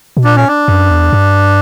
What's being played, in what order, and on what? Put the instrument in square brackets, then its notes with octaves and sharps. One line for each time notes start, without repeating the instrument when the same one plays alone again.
[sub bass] B2
[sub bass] A#2 [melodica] D4
[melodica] C#4
D4
[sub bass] F#2
E2
G2